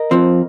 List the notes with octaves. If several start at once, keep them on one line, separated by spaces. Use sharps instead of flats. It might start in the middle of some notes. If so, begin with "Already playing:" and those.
Already playing: A#4 D#5
F2 F3 C4